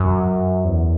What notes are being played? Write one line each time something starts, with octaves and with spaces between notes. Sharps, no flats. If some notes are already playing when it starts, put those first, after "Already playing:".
Already playing: F#2
E2